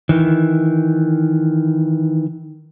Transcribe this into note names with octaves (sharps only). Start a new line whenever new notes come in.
D#3 E3